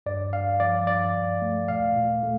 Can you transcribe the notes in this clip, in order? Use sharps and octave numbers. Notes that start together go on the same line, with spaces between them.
G2 D5
G2 F5
F3 D5
G2 D5
G2
A3
A#2 F5
A#2
A3